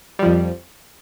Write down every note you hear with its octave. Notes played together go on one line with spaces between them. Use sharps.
F2 F3 G3